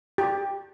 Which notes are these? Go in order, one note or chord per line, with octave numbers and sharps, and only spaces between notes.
G4